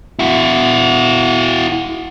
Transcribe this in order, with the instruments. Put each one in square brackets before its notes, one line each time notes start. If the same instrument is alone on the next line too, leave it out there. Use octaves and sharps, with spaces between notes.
[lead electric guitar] E4 F#4